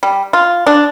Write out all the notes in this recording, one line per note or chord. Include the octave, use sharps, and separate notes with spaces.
G3
F4
D4